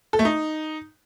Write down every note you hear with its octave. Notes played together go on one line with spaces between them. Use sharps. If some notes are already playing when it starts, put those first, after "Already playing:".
A4
A3
D#4